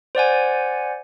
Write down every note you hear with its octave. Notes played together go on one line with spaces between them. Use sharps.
C5 D5 F#5 G#5